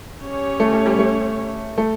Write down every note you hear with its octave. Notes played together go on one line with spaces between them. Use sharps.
C#4 G4 C#5
A3
A3
G3
A3
A3